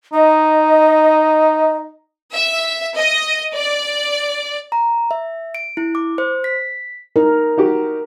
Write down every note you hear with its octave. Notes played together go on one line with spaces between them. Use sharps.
D#4 D#5
E5
D#5
D5
A#5
E5
D7
E4
D6
C5
B6
D#4 A#4
D#4 F#4 G4